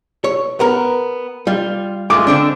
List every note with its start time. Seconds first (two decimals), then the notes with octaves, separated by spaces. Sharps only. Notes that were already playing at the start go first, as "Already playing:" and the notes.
0.24 C#5
0.60 B3 A#4
1.47 G3 F4
2.10 G#3 A3 F4 D6
2.27 D3 C4 D4